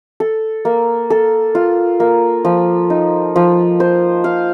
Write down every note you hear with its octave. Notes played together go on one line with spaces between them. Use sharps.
A4
A#3
A4
F4
A#3
F3
D#4
F3
C5
F5